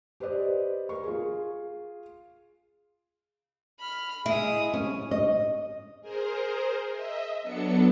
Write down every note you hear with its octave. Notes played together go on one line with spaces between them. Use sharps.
G4 B4 C5 D5 D#5
A#4 C#6
F4 G#4
B5 F6
G#3 E4 D#6
C#4
D#5
G#4 A#4 C5
D#5 E5
F#3 B3 D4 A4 C#7